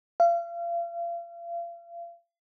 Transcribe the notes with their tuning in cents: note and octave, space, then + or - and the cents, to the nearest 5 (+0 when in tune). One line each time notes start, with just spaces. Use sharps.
F5 -35